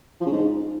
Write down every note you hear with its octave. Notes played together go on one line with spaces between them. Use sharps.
F3
C#3
G#2